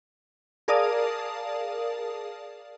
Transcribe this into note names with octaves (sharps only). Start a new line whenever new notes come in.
G#4 A#4 D5 F5 A5 D#6